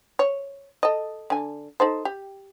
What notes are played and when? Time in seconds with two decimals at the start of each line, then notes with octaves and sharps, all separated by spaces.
0.19 C#5
0.83 A4 D#5
1.30 D3 G#5
1.80 D#4 A4 C5
2.05 G4